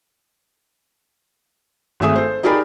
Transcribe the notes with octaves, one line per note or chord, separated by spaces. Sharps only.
G#1 A3 G#4 E5 D#6
A4 C5
D#4 G4 G#4 A#4 D5 B5